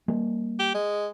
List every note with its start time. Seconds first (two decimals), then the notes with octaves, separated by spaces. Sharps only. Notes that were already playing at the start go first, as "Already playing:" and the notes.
0.08 G3 A#3
0.59 G4
0.74 G#3